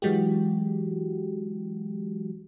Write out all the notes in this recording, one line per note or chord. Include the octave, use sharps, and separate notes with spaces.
E3 F#3 G#3 F#4 G4